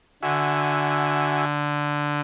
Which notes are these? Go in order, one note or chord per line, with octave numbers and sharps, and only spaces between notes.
D3 F#4 E5 G#5